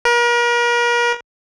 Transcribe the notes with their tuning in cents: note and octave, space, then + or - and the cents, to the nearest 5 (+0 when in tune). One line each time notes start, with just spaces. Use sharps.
A#4 +40